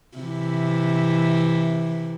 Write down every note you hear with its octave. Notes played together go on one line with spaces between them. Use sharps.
C3 E3